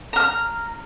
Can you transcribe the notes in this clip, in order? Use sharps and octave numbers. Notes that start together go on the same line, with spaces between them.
A#5 F6